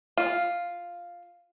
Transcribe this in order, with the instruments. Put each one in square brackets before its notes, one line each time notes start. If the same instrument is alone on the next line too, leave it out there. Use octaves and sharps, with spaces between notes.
[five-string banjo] F4